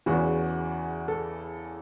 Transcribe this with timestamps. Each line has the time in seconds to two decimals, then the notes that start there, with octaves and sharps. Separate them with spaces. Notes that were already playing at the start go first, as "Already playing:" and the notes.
0.06 E2 C#3 E3 F#4
1.08 A4